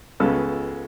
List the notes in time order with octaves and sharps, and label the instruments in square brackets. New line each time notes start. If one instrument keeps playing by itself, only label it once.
[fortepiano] C#2 C#3 G#3 B3 A4